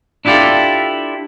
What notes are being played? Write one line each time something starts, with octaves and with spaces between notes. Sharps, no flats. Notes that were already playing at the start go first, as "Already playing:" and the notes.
D4 E4 F4 G4 A4